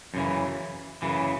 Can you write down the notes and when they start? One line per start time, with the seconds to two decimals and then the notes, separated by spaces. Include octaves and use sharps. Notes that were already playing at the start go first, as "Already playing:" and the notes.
0.14 F#2 C#3 E3
1.02 F#2 C#3 E3